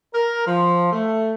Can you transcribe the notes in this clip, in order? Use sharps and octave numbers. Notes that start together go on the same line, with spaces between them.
A#4
F3
A3